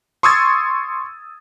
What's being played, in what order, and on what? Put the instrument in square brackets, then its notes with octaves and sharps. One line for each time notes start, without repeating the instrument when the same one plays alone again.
[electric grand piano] C6 C#6 D#6 E6 G#6 A6